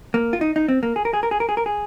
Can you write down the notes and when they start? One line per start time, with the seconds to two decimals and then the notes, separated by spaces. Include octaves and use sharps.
0.14 A#3
0.33 F4
0.41 D#4
0.56 D#4
0.68 C4
0.83 A#3
0.96 G#4
1.05 A#4
1.14 G#4
1.23 A#4
1.31 G#4
1.40 A#4
1.49 G#4
1.57 A#4
1.66 G#4